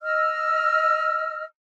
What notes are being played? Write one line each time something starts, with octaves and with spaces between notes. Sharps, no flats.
D#5 E6 F6